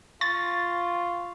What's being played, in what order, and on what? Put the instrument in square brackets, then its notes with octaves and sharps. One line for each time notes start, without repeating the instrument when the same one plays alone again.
[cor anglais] F4 [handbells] C#6 [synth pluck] A6